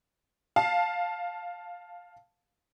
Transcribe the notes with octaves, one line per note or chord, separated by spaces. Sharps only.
F5 A5